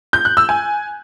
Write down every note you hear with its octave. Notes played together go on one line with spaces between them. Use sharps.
G6
F#6
E6
G#5